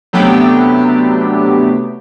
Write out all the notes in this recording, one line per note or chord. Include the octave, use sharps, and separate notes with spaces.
C3 F#3 A3 B3 D4 G4